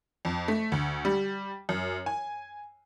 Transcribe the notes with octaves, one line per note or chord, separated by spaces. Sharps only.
F2
A3
D2
G3
F#2
G#5